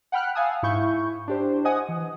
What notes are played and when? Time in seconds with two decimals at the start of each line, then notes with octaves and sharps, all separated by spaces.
0.12 F#5 G5 B5 F6 F#6
0.35 F5 F#5 G#5 A5 D#6 E6
0.63 G#2 E4 C#6 G6
1.28 D4 G4 C5
1.65 D#5 F#5 G#5 D#6
1.89 E3